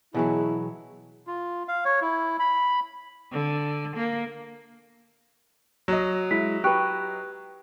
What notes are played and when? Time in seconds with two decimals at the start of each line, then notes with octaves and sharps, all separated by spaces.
0.14 B2 E3 F#3 E4 G#4
1.27 F4
1.68 F5
1.85 C#5
2.02 E4
2.40 B5
3.32 D3
3.96 A#3
5.88 F#3 D#5
6.31 G#3 E4 B6
6.64 G4 B4 G5 C#6 F#6